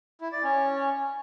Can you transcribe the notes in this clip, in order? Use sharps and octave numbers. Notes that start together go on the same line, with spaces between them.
E4
D5
C#4